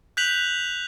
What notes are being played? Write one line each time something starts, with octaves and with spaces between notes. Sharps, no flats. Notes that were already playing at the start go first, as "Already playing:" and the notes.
F#6 G6 B6 F7 F#7